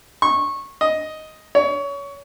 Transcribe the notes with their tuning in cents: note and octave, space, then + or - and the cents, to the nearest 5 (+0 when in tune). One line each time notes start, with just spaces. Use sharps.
C#6 -20
D#5 +5
C#5 +25